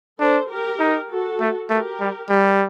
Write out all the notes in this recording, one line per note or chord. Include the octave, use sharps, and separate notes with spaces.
D4 A4 C5
G4 A#4
D#4
F#4 A4
A3
A3 G4 A#4
G3
G3